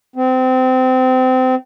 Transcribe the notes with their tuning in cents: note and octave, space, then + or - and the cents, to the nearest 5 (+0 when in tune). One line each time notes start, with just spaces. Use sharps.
C4 -25